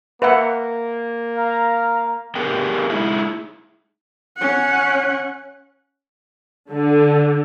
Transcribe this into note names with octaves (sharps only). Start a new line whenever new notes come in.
A#3 B4 E5 F#5
F5 A#5
B3 G4 G#4 A#4 G5
G#3 D#4 E4 G#4
C#4 F#5
D3